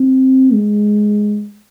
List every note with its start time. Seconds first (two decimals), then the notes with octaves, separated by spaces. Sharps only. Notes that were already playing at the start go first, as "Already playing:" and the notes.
Already playing: C4
0.53 G#3